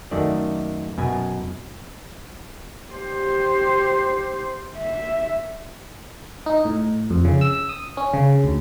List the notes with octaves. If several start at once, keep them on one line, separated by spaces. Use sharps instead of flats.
F#2 D#3 A3 D5
F#2 B2 G#5
G4 C5
E5
D#4
A2
F2
C#3
E6
D#6
C#4
C#3
D2